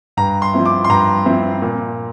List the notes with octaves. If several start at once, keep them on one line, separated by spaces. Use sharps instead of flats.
G2 A#5
C6
F3 C4 E4
D6
C6
G2 A#5
F3 C4 E4
A#2